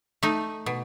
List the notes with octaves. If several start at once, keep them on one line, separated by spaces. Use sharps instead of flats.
A3 D#4
B2